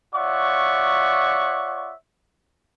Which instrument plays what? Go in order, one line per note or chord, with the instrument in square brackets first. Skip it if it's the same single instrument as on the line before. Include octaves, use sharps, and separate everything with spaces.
[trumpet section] F4 C#5 D5 E5 F#5 C#6